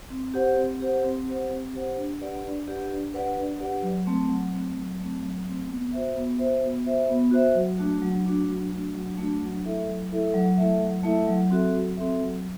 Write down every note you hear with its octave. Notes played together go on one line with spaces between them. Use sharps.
C4
G4 C5 F#5
C4
G4 C5 F#5
C4
G4 C5 F#5
C4
G4 C5 F#5
D4
G4 B4 D5 F#5
D4
G4 B4 D5 F#5
D4
G4 B4 D5 F#5
D4
G4 B4 D5 F#5
F#3
A3 C4
F#3
A3 C4
F#3
A3 C4
F#3
A3 C4
B3
F#4 C5 E5
B3
F#4 C5 E5
B3
F#4 C5 E5
B3
F#4 C5 E5
F#3
A3 D4 F#4
F#3
A3 D4 F#4
F#3
A3 D4 F#4
F#3
A3 D4 F#4
F#3
A3 E4 A4 E5
F#3
A3 E4 A4 E5
F#3
A3 E4 A4 E5
F#3
A3 E4 A4 E5
F#3
C4 F#4 A4 E5
F#3
C4 F#4 A4 E5
F#3